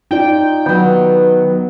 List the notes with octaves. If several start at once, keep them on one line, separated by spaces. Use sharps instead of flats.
D#4 F4 D5 G5
D#3 F#3 B3